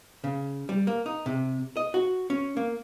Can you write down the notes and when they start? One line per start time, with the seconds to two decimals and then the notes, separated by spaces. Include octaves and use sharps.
0.24 C#3
0.69 G3
0.87 A#3
1.06 D#4
1.26 C3
1.77 D#5
1.94 F#4
2.30 C#4
2.57 A#3